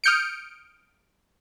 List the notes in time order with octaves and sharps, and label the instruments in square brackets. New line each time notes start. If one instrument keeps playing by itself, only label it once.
[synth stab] D#6 F6 G6 C#7 D7